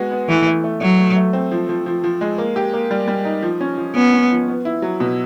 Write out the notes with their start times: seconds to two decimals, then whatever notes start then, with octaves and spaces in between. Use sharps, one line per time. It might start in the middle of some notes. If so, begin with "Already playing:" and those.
Already playing: G#3 B3 F#4
0.12 B3
0.29 E3 A3
0.47 A3
0.64 A3
0.81 F#3 A3
0.99 A3
1.16 A3
1.33 C4
1.51 F3
1.69 F3
1.86 F3
2.04 F3
2.21 G#3
2.38 A#3
2.56 G4
2.73 A#3
2.91 G3
3.08 G3
3.25 D#4
3.42 F3
3.61 C#4
3.78 F3
3.95 B3 C#4
4.13 C#4
4.30 F3
4.48 B3
4.65 E4
4.82 F#3
5.00 B2